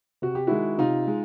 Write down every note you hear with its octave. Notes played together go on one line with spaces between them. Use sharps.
C3 F#4
G4
D#3 G#3 E4 F#4
C3 D#4 F4
G#3